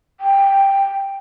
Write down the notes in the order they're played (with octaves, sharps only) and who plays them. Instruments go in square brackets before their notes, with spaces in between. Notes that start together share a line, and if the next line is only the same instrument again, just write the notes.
[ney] G5